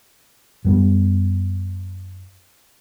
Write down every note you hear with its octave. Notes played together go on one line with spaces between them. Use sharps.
F#2 G3 B3